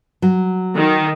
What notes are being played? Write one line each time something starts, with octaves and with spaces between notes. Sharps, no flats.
F#3
D#3